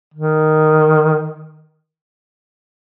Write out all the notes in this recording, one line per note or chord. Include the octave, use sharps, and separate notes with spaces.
D#3